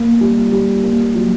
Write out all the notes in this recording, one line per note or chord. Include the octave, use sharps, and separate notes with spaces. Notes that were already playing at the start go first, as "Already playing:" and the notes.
Already playing: A#3
G3
G3
A#3
F#3